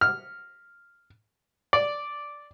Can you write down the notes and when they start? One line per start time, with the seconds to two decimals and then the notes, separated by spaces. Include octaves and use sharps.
0.01 F6
1.73 D5